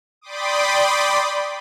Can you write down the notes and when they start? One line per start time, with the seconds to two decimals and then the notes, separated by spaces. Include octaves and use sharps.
0.21 D5 G5 B5 C6 D6 D#6